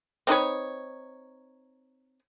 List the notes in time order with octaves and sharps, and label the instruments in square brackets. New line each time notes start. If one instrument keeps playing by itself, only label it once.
[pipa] C4 D#4 B4 C#5